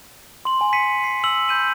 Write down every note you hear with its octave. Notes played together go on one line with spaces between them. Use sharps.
C6 F#7
G#5
B6 C#7 D#7
C7
E6 F#7
B5 G6 D#7 F#7